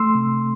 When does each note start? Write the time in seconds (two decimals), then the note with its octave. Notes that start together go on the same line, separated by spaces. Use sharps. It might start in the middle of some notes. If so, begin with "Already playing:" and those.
Already playing: A3 C6 E6
0.15 C3